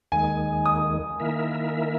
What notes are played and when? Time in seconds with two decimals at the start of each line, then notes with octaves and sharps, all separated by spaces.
0.12 D#2 D#3 G#3 G#5
0.66 D#6
1.20 D#3 A#3 E4 A#4 E5